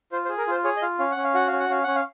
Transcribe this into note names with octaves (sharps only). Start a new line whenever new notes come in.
F4 C5
C5
G#4
A#4
F4 C5
G#4 C#5
D#5
F4 F5
C#4 F5
F#5
C#4
F5
F#4 F#5
C#4 F5
F#5
C#4 F5
C#4 F#5
F5